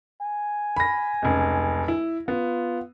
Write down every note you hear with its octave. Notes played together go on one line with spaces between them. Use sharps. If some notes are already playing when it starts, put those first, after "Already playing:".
G#5
B5 A#6
F1 C#2
E4
B3 F4